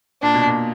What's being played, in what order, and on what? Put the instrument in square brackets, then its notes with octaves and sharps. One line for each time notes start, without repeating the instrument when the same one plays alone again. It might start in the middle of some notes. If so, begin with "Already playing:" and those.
[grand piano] A#2 [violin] D4
[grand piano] B2
A#2